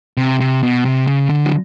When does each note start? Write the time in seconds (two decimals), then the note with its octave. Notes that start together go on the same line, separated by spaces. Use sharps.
0.17 C3
0.40 C3
0.63 B2
0.85 C3
1.07 C#3
1.29 D3
1.46 F#3